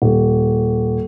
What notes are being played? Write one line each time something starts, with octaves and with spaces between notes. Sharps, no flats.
D#1